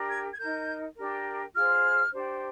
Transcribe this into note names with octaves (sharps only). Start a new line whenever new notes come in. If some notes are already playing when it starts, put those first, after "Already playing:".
Already playing: D4 G4 A#4
G#6
G#6
D#4 A#4 G6
D4 G4 A#4
F4 G#4 C5 F6
D4 G4 C5